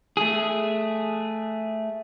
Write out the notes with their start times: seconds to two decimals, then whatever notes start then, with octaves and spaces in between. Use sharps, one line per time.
0.17 A3 G#4